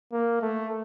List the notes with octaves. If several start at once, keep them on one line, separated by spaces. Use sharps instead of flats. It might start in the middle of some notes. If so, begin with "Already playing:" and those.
A#3
A3